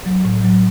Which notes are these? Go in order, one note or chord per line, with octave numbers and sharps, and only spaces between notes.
F#3
A2
F#3